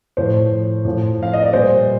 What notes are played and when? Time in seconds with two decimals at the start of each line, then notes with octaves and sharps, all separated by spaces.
0.17 A2 F3 C5
0.85 A2 F3
1.23 F5
1.33 D#5
1.42 D5
1.53 A#2 G3 C5